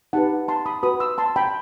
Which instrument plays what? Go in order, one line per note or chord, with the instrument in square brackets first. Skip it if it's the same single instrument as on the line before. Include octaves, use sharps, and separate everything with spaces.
[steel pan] D#4 G4 B4 F#5 A5
A5 C6
B5 D#6
F#4 B4 B5 D#6
C6 E6
A5 C6
G5 B5